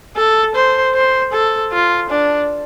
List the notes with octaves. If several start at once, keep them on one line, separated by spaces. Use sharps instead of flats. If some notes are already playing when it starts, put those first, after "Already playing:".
A4
C5
C5
A4
F4
D4